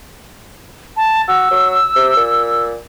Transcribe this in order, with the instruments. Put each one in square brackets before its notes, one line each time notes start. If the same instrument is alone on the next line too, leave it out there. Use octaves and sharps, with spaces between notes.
[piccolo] A5
[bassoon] F#4 [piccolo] E6
[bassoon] F#3
C3
A#2